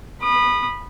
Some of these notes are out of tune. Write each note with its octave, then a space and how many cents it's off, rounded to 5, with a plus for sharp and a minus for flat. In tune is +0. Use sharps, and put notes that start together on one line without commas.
B5 -10 D#6 -30